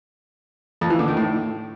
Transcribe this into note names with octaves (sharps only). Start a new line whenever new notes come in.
F2
E3
D3
D#3
A2